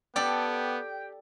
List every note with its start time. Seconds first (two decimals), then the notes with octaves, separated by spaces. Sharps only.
0.16 B3 G4 A4 D5 G5